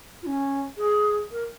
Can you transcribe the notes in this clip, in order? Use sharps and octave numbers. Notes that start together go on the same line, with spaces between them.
F4
C#4
G#4
A#4